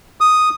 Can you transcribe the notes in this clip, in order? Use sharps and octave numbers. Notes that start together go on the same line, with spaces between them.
D#6